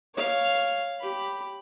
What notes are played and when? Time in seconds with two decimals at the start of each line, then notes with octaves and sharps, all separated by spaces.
0.15 C#5 F5
1.01 G4 B5